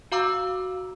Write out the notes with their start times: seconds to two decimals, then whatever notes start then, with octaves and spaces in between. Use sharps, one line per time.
0.12 F#4 F5 A#5 D6 E6